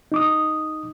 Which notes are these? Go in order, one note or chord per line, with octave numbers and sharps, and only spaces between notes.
D#4 D6 D#6